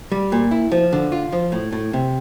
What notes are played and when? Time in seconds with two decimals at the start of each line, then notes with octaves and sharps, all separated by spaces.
0.12 G3
0.32 A#2
0.51 E4
0.72 F3
0.93 D3
1.12 F4
1.32 F3
1.52 A2
1.72 A2
1.93 C3